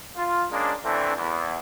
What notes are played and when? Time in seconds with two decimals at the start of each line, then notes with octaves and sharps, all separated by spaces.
0.16 F4
0.51 G#3 A#3 C#4 D4
0.84 D3 E3 A3 C4 D4
1.16 E2